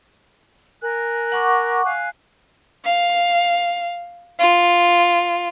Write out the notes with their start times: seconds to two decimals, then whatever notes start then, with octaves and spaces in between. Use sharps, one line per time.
0.81 A#4 G#5 F#6
1.32 F#5 C#6 D6
1.84 F5 G#5 F#6
2.85 F5
4.39 F4